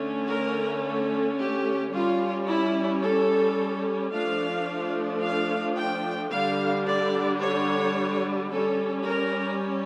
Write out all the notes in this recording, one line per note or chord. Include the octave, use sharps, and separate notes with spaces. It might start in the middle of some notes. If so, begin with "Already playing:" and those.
Already playing: D3 A3 C#4
A#4
A4
G4
G3 C#4 F4
E4
A4
F3 A3 D4 F5
F5
G5
D3 G3 D4 F5
D5
C#5
G3 C#4 A4
A#4